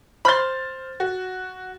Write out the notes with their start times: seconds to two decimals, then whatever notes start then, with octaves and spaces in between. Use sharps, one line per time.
0.25 C5 B5 C6 F6 A6
1.00 F#4